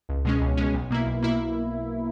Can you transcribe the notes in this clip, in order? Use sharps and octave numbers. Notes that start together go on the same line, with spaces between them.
C#2
B2 G#3 C#4
C#2
B2 G#3 C#4
B1
B2 A#3 E4
B1
B2 A#3 E4